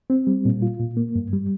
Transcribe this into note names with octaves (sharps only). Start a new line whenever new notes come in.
C4
G3
A#2
F4
A#2
A#3
G2
G3